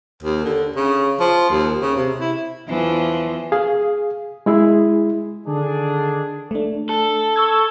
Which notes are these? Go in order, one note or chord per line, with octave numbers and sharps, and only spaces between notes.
D#2
D3
C#3
F3
D#2
C#3
C3
E4
E2 E3 F3
G#4 F5
G#3 E4 G#4
D3 D#3 D4 G#4
A3 D4
A4
C#6 E6 G#6